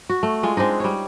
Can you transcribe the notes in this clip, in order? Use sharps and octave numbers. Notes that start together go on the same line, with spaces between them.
F#4
A3
G#3 F4
G#3 C4 D4 D#4
G3 C#5